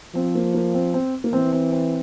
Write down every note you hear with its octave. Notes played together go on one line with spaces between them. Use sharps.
F3 C4
A#3
A#3
C4
C4
A#3
E3 C4
C4
C4